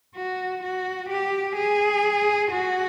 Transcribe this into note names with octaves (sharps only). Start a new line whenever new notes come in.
F#4
F#4
G4
G#4
F#4